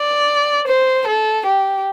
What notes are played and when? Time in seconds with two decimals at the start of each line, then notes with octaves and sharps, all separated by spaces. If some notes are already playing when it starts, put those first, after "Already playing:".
Already playing: D5
0.68 C5
1.07 A4
1.46 G4